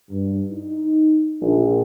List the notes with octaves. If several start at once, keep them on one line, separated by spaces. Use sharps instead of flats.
G2
D#4
A#1